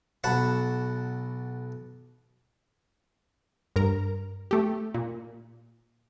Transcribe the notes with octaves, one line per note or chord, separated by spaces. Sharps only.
B1 F#5 A5 B5 C#6
G2 A#4 A#5
A3 G4
A#2